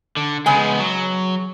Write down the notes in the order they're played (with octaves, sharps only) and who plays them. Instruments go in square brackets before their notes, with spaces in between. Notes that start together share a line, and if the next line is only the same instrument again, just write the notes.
[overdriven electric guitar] D3
[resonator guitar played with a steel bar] C#3 G#5 [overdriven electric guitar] G#3 B3
[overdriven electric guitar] F#3